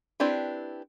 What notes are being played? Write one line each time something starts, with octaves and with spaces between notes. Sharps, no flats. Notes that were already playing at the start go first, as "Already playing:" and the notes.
C4 D4 E4 G4 B4